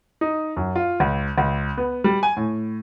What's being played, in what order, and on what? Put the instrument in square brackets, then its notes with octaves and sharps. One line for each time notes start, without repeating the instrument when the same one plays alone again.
[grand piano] D#4
F#2
F4
C#2
C#2
B3
G3
G#5
A2